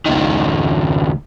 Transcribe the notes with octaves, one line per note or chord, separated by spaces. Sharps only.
C#2 D#3